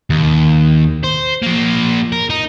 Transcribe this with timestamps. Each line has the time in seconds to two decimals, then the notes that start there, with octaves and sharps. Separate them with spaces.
0.10 D#2
1.04 C5
1.43 F3 A#3
2.12 A#4
2.30 D#4